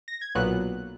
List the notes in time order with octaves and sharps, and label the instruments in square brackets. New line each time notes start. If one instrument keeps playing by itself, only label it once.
[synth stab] A#6
G#6
B1 A#2 F#3 B3 F#6